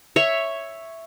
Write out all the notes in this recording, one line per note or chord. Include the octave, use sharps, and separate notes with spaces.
C#5 E5